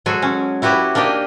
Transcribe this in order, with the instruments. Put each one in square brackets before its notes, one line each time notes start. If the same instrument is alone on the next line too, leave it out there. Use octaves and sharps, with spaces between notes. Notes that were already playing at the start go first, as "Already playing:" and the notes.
[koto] F#3 G#3 F#4 A4 G#5
C#4
E4 F#4 G4 B4 C#5
A#3 D4 D#4 G4 D#5